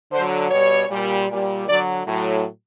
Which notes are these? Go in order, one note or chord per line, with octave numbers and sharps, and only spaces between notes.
D3 F#3 C5
B2 G3 C#5
A#2 G3
A#2 G3
D3 F#3 D5
A2 F#3